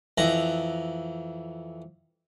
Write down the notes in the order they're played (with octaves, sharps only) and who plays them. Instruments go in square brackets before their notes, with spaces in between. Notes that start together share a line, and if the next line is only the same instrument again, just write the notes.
[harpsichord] F2 E3 A#5